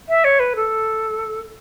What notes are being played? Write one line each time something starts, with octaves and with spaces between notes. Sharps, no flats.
E5
C#5
B4
A4